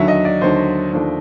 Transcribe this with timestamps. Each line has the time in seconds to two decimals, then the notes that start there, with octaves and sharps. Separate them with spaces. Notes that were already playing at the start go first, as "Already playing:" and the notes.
Already playing: D#2 D3 F#3 E5
0.08 D#5
0.25 D5
0.41 D#2 D3 F#3 C5
0.93 D#2 D3 F3 A3 D4